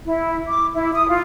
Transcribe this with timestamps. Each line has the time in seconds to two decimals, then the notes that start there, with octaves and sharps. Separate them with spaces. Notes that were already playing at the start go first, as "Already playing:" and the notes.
0.07 E4
0.47 D6
0.74 E4
0.93 D#6
1.09 F4